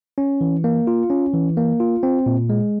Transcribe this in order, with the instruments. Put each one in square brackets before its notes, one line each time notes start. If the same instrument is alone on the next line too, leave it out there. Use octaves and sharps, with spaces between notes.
[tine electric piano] C#4
E3
A#3
F4
C#4
E3
A#3
F4
C4
A#2
G#3